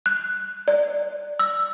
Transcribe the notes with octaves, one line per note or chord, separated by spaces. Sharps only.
F#6
D5
E6